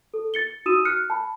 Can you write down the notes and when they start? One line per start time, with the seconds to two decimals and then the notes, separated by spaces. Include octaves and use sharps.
0.14 A4
0.34 A6 C#7 G7
0.66 D#4 F#4 D#6 E6 D#7 E7
0.85 F6 F#6 C#7
1.10 A5 B5